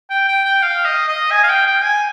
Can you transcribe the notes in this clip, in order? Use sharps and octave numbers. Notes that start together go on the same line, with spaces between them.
G5
G5
G5
F5
D#5
D#5
G#5
F5
G5
G5
G#5